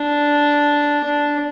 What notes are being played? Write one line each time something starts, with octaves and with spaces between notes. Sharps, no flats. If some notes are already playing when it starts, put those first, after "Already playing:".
Already playing: D4
D4